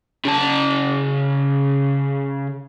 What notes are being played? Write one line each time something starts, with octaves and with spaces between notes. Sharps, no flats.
C#3 A5